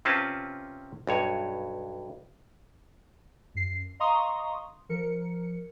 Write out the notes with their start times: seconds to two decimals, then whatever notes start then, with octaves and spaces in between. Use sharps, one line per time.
0.05 C3 C4 C#4 F4 B4 A5
1.07 B1 G2 C#5
3.55 F#2 C7
4.00 D#5 F5 A#5 C6 C#6 D#6
4.89 F3 A#4 C#7